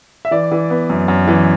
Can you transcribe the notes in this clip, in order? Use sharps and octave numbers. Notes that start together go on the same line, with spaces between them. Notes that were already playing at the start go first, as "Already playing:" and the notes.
E5
E3 D5
E3
B3
F#2
F#2
E3